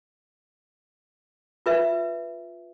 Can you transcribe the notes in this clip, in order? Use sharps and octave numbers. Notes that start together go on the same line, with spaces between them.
F4 B4 E5